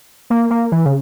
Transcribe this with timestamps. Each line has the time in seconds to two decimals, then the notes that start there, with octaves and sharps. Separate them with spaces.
0.30 A#3
0.50 A#3
0.72 E3
0.86 C#3